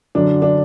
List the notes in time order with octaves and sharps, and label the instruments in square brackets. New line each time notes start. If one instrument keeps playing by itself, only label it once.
[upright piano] F#2 D3 F#3 D4
D4